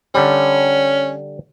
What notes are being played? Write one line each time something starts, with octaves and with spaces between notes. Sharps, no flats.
D3 G3 C#4